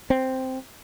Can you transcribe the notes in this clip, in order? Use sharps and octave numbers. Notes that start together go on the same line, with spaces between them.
C4